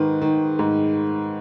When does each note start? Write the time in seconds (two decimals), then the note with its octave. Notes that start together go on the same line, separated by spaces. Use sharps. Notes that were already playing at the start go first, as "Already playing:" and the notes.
Already playing: G#2 D#3 B4
0.22 D#3
0.59 G#2